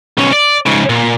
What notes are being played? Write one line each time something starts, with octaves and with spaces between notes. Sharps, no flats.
B1 C#4
D5
G#2 C#3
A#2